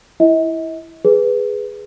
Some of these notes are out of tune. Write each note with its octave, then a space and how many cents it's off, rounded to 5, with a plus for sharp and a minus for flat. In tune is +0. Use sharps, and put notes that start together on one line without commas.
E4 +0 D#5 +45
G#4 +0 B4 +0